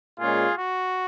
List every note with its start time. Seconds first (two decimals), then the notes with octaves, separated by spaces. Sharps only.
0.18 A#2 G#3 C#4 F4 G#4
0.58 F#4